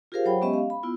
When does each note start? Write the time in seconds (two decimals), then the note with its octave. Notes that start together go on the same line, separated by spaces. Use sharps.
0.12 F4 G4 G#4 A#4 C5 F5
0.25 F#3 C5 C#5 F#5 G5 B5
0.41 G#3 B3 C#4 G4 D#5 E5
0.54 F5
0.70 B5
0.83 B3 E4 F4